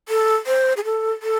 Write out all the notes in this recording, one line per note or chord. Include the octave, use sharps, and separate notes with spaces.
A4
C5
G#4
A4
A4